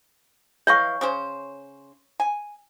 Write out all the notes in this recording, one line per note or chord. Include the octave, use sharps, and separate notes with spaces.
E3 C#5 D#5 F5 C#6
C#3 C#4 C5
G#5